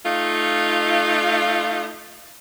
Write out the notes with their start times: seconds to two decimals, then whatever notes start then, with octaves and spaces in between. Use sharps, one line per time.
0.06 A3 D#4 F4